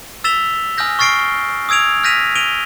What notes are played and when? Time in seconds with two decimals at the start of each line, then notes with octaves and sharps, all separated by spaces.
0.24 E6 A6 B6 E7 F7 G7
0.78 G#5 D#6 F6 G6 A#6
0.99 C#6 F6 A6 C7 D7 G7
1.69 D#6 E6 G#6 D7 F7
2.04 F6 G6 A#6 B6 D#7 F7
2.36 D7 D#7 F7 G7